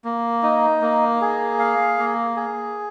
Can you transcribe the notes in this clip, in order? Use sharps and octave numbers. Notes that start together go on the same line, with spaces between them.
A#3
D#4
A#3
G#4
F5
A#3
G#4